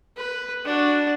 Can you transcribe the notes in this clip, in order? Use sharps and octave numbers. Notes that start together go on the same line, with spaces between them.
B4
D4 F#4